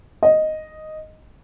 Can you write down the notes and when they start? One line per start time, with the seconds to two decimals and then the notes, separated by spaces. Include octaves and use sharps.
0.23 D#5